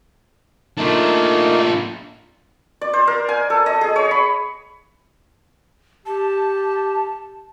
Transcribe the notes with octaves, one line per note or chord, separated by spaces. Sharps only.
A3 A#3 D4 D#4 F4
D5
C5
A#4
G#5
A4
D#5
G#4
C#5
B5
G4 A5